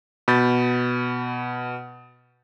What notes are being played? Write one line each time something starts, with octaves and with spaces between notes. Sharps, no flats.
B2 B5 G6 A6